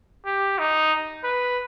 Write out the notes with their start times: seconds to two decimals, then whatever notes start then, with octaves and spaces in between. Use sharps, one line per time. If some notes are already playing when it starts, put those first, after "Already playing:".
0.25 G4
0.59 D#4
1.24 B4